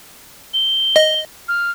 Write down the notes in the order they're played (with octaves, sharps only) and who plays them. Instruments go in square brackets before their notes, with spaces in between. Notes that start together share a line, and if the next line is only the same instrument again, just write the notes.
[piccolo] G7
[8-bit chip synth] D#5
[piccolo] F6